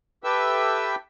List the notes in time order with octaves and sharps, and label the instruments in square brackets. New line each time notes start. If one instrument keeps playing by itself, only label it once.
[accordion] G4 A4 B4 E5 G5 E6